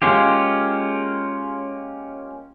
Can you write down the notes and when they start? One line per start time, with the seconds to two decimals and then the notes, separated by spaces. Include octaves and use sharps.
0.02 G#3 A#3 C#4 F4 G4